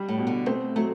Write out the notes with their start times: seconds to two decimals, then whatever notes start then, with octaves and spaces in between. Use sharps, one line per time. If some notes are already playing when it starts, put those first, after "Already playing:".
Already playing: G3
0.08 A2
0.18 B2
0.27 D3
0.46 A3 C4
0.76 F#3 A3